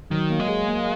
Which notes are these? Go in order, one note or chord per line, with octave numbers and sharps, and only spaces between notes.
D#3 F#3
A#3
G#3
G#4
A#3